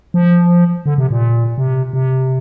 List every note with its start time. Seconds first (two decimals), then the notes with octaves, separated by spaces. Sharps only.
0.14 F3
0.86 D3
0.98 C3
1.11 A#2
1.58 C3
1.93 C3